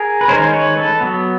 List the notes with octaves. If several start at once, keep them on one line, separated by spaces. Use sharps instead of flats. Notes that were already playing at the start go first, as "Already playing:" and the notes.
Already playing: G#4 A#4
B4
D#3 G#3 C#4 A#4 C5
C5
B4 C#5
A4 B4
F#3 B3